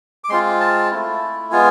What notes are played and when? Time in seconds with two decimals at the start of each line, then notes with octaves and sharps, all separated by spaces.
0.24 D6
0.29 G#3 C4 F4 C6
0.60 A5
0.91 A3 E4
1.52 G#3 B3 F4 G#5